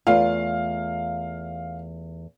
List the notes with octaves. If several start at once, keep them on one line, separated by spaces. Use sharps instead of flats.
E2 A3 F4 F5